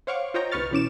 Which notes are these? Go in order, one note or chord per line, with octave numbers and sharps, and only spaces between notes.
C5 C#5 F5 F#5 C#6 D6
F4 C5 C#5 D#5 G5 A#5
G1 C2 B4 C#6 F6 A6
B2 E3 C#4 D6 E7